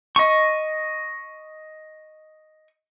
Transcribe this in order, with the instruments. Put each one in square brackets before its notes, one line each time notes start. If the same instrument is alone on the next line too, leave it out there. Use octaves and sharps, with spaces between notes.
[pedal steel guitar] D#5 C#6